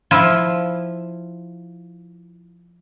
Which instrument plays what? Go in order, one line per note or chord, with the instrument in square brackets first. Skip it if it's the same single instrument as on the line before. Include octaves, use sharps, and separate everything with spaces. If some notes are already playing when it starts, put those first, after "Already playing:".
[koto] F3 E4 F4